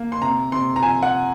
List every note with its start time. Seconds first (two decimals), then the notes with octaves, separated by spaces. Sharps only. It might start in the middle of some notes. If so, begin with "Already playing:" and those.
Already playing: A#3
0.12 C6
0.22 C3 A#5
0.52 C3 C6
0.76 A#5
0.83 F3 G#5
1.03 F#5